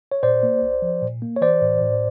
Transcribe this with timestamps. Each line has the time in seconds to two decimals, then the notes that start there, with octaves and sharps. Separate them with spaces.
0.12 C#5
0.23 A#2 C5 D5
0.43 A#3
0.62 C2
0.82 F3
1.02 A#2
1.22 A#3
1.37 C#5
1.41 E3 C5 D5
1.61 A2
1.81 A2